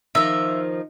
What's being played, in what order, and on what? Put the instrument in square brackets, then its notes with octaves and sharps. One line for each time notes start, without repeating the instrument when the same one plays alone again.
[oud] D#3 F3 [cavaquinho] E5